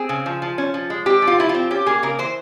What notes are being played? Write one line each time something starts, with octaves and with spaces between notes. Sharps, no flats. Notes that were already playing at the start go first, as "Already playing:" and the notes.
Already playing: C4 G#4
C#3
F3
F3
C#4
F3
G#3
C4 G4
F3
F4
F3 E4
F4
C4
C#4 G4
A#3 G#4
C#3 A#4
E3 C5